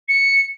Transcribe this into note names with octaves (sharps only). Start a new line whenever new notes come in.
C#7